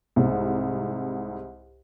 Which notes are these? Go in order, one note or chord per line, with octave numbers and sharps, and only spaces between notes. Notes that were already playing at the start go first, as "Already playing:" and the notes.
C2 G#2